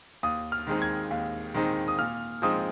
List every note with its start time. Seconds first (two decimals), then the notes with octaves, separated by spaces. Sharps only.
0.23 D#2 D#6
0.52 F6
0.67 D#3 G#3 C4 D#4
0.82 G#6
1.11 D#2
1.54 D#3 G#3 C4 D#4
1.88 D#6
1.99 A#2 F6
2.42 F3 G#3 C4 D#4 D#6